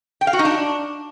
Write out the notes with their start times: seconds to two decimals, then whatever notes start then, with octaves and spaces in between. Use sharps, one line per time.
0.21 G5
0.27 F5
0.33 F#4
0.39 D#4
0.45 D4